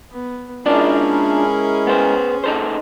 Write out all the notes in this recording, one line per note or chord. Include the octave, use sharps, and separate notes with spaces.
B3
G#3 C#4 D4 E4 F4 G#4 A#4 D5
B3 C5
D#4 A4 C5